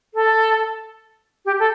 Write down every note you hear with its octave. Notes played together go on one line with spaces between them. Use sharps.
A4
G4
A4